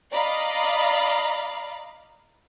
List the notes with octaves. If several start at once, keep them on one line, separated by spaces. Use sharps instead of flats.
D5 D#5 F5 A#5 B5